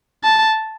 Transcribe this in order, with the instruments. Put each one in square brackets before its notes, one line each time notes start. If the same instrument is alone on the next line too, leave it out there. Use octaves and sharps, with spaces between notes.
[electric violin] A5